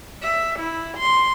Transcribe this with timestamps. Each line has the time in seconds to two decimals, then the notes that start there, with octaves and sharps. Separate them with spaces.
0.23 E5
0.59 E4
0.97 C6